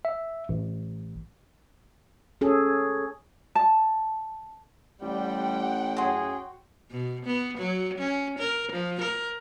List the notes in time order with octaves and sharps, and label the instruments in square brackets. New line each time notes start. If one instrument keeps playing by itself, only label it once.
[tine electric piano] E5
A1
[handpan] C#4 G#4 A4
[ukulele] A5
[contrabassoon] A1 [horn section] G3 [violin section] F#5 G5
[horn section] F#2 C#4 G#4 [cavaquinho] F#4 C6
[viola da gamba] B2
B3
F#3
C#4
A#4
F3
A#4